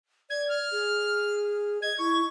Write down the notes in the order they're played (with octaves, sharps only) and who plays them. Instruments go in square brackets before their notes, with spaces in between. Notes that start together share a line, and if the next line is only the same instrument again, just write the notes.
[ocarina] D5 [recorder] G#6
[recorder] F6
[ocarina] G#4
[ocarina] D#5 [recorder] G#6
[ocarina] E4 [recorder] C#6